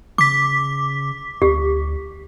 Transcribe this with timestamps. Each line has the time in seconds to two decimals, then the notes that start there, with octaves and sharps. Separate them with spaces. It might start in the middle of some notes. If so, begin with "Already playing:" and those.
0.18 C#3 D6 B6
1.42 D2 G4